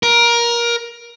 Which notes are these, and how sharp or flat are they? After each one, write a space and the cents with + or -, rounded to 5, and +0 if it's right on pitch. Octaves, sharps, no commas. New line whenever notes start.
A#4 +20